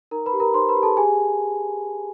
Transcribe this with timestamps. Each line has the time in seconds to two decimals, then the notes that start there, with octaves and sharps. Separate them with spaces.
0.11 D#4 A#4 A#5
0.26 B4 B5
0.33 G4
0.40 A#4 A#5
0.54 D#4 C5 C6
0.69 B4 B5
0.76 G4
0.83 A4 A5
0.97 G4 G#4 G#5